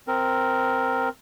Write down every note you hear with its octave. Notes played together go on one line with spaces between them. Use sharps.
C4 A#4